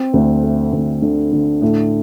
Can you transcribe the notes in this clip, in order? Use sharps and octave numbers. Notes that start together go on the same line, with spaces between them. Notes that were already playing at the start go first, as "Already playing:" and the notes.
Already playing: C4
D2
A3
D2
D3
D3
A2